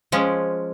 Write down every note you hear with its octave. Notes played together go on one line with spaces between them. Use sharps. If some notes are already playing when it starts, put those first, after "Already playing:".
F3 G#3 C#4